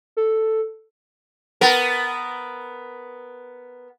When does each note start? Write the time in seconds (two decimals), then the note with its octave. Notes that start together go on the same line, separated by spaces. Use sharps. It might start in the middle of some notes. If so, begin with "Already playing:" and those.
0.17 A4
1.61 B3 A#4